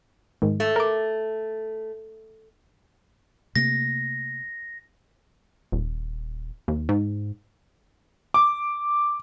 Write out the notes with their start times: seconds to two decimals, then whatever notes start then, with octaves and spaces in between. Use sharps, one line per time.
0.42 G#2 D#3
0.60 A3
0.76 A#4 D6
3.56 C3 A3 A#3 A#6
5.72 D#1
6.68 D#2
6.89 G#2
8.34 D6